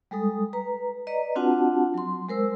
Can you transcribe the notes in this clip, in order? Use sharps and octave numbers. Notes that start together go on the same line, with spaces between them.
G3 G#3 A4 D#6
B4 A#5
B4 D5 D#5 A#5
C4 D4 F4 F#4 F#5 A5
F#3 C6
G#3 A#4 C5 E6